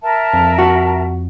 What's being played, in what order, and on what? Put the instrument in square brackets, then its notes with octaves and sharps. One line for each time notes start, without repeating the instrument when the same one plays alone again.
[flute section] A#4 E5 A5
[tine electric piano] F2
[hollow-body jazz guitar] F#4